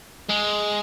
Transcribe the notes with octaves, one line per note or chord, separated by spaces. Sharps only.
G#3